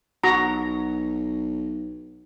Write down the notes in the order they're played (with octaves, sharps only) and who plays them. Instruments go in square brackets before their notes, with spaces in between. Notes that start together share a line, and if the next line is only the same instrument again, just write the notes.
[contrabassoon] B1 [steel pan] F#4 A#5